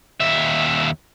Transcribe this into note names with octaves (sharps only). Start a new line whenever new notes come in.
D#2 E5